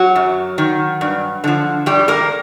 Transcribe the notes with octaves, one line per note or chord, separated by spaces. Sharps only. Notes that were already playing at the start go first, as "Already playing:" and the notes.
Already playing: F#3 F#4
F#2
D#3
G2
D3 F3
G2 G3 G4
A#3 A#4